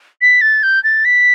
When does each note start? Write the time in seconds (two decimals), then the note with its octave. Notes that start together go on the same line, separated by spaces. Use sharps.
0.21 B6
0.41 A6
0.63 G6
0.84 A6
1.05 B6